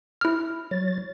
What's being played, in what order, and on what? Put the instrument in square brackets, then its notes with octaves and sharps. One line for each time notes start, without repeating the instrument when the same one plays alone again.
[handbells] E4 F6
[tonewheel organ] F#3 C#5 A6